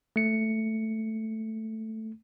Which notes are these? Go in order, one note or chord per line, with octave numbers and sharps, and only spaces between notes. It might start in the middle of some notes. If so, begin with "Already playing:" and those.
A3 C#7